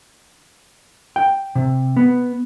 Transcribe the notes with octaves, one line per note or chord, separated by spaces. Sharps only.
G5
C3
B3